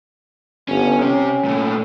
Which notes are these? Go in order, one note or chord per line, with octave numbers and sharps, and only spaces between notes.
G1 C#4
C3 C#4 G4
A#2 A3